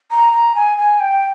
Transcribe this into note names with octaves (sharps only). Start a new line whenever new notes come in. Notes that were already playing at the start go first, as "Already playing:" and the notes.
A#5
A#5
G#5
G#5
G5